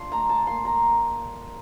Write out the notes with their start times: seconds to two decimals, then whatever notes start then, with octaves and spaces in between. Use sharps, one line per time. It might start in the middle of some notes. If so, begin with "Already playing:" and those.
Already playing: D4 F4 C6
0.12 A3 A#5
0.29 A5
0.47 A#3 C6
0.65 A#5